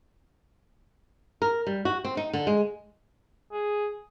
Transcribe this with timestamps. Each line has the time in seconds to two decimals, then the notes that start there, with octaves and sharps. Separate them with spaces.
1.42 A#4
1.67 G3
1.85 F#4
2.05 C4
2.17 D#4
2.33 D3
2.47 G#3
3.52 G#4